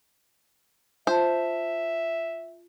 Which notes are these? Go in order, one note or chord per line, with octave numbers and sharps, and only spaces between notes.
F4 C5 E5 A5